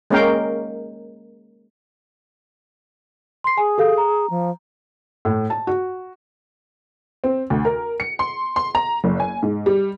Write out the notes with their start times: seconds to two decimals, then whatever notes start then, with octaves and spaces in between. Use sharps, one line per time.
0.10 G#3 A#3 C#4 A#4 F5 G5
3.44 C6 C7
3.58 G#4 G#5
3.78 G4 A4 F5
3.98 A#5
4.30 F3
5.25 A2
5.50 A5
5.67 F#4
7.24 C4
7.50 D2
7.65 A#4
8.00 C#7
8.19 C6
8.56 C6
8.75 A#5
9.04 F#1
9.20 G#5
9.43 G#2
9.66 G3